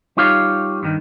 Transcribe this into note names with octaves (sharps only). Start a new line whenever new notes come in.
G3 D#4 F4 G4 C#5 F5
G2 D#3